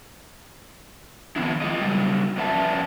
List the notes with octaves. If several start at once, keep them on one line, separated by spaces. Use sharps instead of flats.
D#3 F3 B3 C4 D4 E4
G#3 E4 F4 D#5
C#3 F#3 G3
F2 C#4 B4 D5 E5 A5